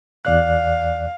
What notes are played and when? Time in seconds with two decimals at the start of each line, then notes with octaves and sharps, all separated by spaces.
0.25 E2 D5 F5 F#6